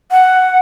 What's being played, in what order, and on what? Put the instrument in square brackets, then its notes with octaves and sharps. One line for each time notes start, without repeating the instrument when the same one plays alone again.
[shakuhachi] F#5